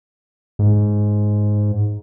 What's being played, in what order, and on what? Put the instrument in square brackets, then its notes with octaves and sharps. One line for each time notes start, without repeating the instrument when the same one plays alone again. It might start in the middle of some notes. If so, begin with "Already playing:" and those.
[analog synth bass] G#2